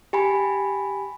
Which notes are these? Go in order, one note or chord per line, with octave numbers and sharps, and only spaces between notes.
G4 G#5 B5